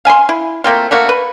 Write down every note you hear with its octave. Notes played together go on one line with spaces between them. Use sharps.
F5 G#5 B5 C6
E4
A3 A#3 C4 F4
A3 A#3 F#4 F5
B4